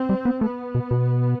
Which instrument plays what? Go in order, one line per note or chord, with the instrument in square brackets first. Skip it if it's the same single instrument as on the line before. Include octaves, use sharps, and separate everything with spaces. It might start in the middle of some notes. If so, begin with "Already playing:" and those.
Already playing: [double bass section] C4
[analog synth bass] G3
B3
[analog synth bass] A3 [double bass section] B3
[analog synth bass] B2
B2